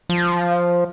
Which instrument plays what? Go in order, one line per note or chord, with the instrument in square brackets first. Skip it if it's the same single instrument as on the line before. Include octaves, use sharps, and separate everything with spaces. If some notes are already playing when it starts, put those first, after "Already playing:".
[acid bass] F3